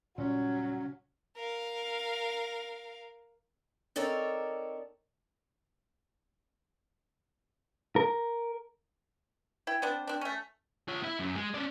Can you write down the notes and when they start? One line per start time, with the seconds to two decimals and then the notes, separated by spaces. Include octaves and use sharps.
0.18 A#2 C#3 F#3 G3 C#4
1.36 A#4 F5
3.96 C4 D#4 A4 A#4 C#5 D5
7.96 A#4
9.67 E4 G5
9.82 B3 C4 D4 C5
10.07 C4 D4
10.21 A3 C#4
10.88 F4 C#5
11.03 E4 E5
11.20 F#2
11.36 G#3
11.54 C#4 D5